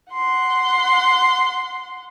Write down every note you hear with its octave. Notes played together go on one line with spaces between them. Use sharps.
F#5 C6